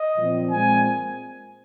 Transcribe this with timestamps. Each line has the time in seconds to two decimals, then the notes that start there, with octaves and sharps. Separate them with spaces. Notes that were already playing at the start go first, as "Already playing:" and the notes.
Already playing: D#5
0.17 A#2 F3 C4
0.50 A#2 G#3 C4 G#5